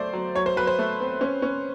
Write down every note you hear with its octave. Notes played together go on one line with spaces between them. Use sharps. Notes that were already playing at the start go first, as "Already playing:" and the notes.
Already playing: F#3 A3 C5 D5
F#3
F#3 C#5
C5
F#3 B4
C5
A3
C4
C#4
C#4